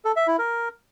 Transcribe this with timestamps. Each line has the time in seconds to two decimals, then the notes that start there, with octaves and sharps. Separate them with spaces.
0.05 A4
0.16 E5
0.27 E4
0.39 A#4